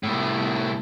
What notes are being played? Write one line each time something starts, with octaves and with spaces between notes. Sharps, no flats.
C2 A2